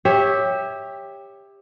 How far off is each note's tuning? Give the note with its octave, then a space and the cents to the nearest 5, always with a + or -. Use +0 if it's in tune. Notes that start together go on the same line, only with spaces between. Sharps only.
G4 +15 C#5 -5 E5 -15